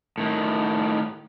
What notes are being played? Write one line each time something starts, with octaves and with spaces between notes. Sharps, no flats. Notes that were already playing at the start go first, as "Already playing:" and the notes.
A2 D#3